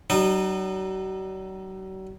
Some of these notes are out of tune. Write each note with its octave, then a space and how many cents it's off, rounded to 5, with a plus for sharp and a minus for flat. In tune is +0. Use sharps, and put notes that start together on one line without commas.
F#3 +45 D#4 -35